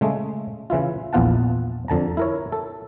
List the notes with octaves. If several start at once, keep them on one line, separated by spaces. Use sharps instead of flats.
C#3 G#3 A3
C#3 E3 E4 F4
A#1 E2 B3 F4 F#5 A5
F2 D3 A5 A#5
E4 A#4 C#5
A4